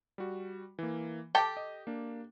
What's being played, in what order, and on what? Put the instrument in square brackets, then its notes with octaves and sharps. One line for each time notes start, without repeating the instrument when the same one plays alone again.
[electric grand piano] G3 F#4
E3 A#3
[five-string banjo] G4 A4 G5 [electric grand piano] A5 D6
[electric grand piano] D#5
A#3 D4